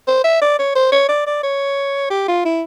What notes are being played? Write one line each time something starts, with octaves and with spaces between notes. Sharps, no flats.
C5
E5
D5
C#5
C5
C#5
D5
D5
C#5
G4
F4
E4